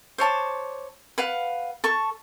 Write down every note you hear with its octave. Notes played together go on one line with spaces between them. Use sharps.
C5 C#5 A5 D6
B4 F5 F#5
A4 A5 C#6